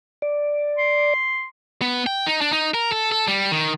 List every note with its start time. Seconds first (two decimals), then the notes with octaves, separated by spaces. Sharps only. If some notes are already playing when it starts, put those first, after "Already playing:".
0.22 D5
0.78 C6
1.82 B3
2.06 G5
2.27 D#4
2.41 D4
2.53 D#4
2.74 A#4
2.92 A4
3.12 A4
3.28 G3
3.52 D#3